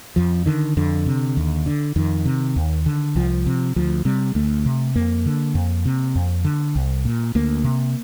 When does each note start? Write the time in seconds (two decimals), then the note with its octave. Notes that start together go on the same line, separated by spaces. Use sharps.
0.16 F2 F3
0.46 D3 D#3
0.77 F2 D3
1.06 C3
1.37 D#2
1.66 D3
1.96 F2 D#3
2.26 C3
2.56 D#2
2.86 D3
3.16 C2 F3
3.46 C3
3.76 D2 F3
4.05 C3 G3
4.35 D2 A3
4.66 C3
4.96 F2 A#3
5.26 D3
5.55 F2
5.86 C3
6.15 F2
6.45 D3
6.76 C2
7.05 A#2
7.35 D2 A#3
7.64 C3